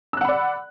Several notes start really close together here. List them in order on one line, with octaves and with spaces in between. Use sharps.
E6 F#6 F#5 B5 D5